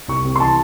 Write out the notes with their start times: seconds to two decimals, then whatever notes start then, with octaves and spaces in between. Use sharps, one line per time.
0.08 C2 C#6
0.25 C3
0.36 C6
0.40 E3 A5